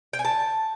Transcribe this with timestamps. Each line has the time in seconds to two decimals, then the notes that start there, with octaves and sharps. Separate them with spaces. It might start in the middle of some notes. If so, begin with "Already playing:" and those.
0.13 G5
0.19 G#5
0.25 A5